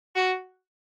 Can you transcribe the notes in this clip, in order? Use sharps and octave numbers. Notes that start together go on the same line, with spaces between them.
F#4